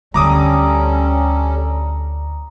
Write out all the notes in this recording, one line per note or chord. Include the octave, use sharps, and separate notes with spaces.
D2 D3 G3 C#4 A4 A#5 D6 D#6